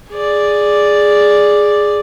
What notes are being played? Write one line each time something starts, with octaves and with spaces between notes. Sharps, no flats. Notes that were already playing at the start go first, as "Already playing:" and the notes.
G#4 D5